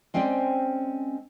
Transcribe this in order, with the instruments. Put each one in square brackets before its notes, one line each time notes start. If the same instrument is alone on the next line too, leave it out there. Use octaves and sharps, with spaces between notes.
[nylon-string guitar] G#3 C4 C#4 C5 D5 G5